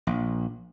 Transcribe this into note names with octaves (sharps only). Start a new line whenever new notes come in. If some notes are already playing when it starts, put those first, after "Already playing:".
A#1